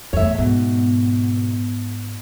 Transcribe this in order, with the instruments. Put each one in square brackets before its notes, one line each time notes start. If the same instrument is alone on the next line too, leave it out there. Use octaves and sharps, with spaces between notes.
[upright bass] E2 A2 [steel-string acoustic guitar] C#5 E5
[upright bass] G#2 [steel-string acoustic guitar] B2